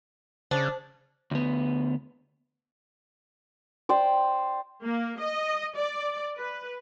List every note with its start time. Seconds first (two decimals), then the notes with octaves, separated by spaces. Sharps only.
0.51 C#3 D4 C5
1.31 D2 B3
3.89 C5 D5 G5
4.83 A#3
5.19 D#5
5.76 D5
6.37 B4